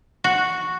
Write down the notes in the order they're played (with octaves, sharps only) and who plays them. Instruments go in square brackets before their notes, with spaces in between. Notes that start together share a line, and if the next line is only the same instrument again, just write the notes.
[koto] F#4